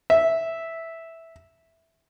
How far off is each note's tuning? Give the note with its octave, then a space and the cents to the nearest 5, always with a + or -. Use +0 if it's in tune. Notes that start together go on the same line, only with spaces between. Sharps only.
E5 -5